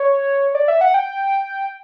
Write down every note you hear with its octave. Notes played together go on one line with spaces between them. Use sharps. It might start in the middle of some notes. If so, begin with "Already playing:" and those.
Already playing: C#5
D5
E5
F#5
G5